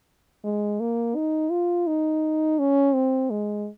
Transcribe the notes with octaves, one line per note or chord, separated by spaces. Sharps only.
G#3
A#3
D#4
F4
D#4
C#4
C4
G#3